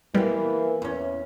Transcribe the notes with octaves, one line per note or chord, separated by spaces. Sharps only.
E3 G3 A#3 B3
E2 C#4